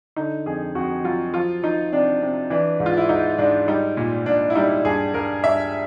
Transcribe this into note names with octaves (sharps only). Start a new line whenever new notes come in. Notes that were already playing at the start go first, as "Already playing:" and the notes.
D3 D#4
F2 G#4
F2 F#4
F#3 F4
F3 F4
F3 D#4
C3 D4
C3
E3 D4
G#2
F4
E4
G#2 D#4
G#2 D4
G3 D#4
A#2
A#2 D4
E4
G3 D#4
G2 G#4
G2 A#4
G2 E5